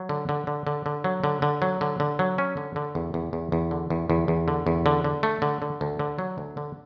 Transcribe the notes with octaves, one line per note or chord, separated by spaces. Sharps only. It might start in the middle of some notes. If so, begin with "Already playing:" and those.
Already playing: F#3
D3
D3
D3
D3
D3
F#3
D3
D3
F#3
D3
D3
F#3
C#4
D3
D3
E2
E2
E2
E2
D3
E2
E2
E2
D3
E2
D3
D3
A3
D3
D3
D2
D3
F#3
D2
D3